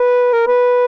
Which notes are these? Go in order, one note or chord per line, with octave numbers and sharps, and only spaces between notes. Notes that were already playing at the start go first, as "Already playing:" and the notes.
Already playing: B4
A#4
B4